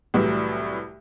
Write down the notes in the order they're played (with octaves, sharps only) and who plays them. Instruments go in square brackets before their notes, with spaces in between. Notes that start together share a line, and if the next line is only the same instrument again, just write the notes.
[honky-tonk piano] C2 A2 E3 F#3 G3